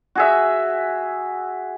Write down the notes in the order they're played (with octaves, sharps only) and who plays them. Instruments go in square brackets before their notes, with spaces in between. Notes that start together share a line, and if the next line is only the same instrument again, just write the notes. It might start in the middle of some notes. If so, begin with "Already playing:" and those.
[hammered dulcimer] F#4 G#4 E5